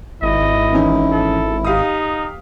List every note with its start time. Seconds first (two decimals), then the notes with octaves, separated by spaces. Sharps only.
0.22 G#1 E4 D#5
0.73 E3 C#4 D#4
1.12 A4
1.65 D#4 G4 F5 D#6